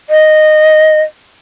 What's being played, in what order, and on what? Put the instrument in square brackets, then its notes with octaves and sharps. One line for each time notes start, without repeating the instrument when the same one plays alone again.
[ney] D#5